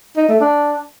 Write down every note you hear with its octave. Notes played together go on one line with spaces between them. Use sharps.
D#4
A3
D4